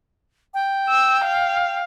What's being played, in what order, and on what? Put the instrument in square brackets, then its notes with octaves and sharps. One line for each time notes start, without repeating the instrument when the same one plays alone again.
[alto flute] G5
[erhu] E6
F5